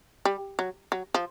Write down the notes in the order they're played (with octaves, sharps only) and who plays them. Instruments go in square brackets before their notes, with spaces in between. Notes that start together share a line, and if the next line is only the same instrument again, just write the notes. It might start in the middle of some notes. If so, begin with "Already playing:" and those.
[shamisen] G3
F#3
F#3
F3